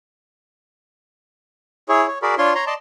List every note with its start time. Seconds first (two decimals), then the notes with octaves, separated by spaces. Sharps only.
1.89 E4 G#4 C#5
2.07 C#5
2.22 F#4 G#4 A#4 D5 B5
2.38 D4 F4 C#5 C6
2.55 C#5 A#5 C6
2.67 D5 D#5 A5 C6